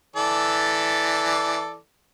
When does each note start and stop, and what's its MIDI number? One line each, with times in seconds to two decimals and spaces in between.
0.16 1.77 52
0.16 1.77 69
0.16 1.77 74